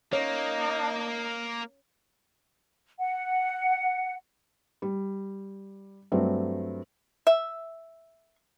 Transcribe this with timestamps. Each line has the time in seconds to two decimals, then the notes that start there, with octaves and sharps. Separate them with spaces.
0.13 A#3 D#4 C#5
2.99 F#5
4.82 G3
6.12 G2 F#3 A3 C4
7.27 E5